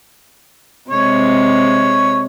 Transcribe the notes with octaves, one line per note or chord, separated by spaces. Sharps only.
C3 G#3 C#5